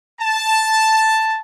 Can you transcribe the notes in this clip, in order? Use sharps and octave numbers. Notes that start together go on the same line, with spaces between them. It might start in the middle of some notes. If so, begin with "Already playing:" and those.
A5